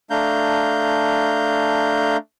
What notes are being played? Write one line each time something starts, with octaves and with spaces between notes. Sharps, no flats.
A3 D4 F5 A#5 G6